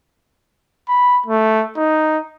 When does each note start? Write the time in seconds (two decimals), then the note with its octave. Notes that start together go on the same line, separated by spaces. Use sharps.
0.89 B5
1.27 A3
1.76 D#4